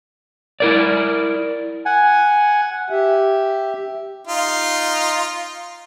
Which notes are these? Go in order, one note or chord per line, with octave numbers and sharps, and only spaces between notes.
E4 A#4 D5
F#5 G#5
G4 E5
D#4 F4